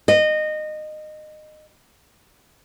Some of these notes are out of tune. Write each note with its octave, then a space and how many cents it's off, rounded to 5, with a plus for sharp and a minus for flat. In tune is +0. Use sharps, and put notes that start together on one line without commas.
D#5 -20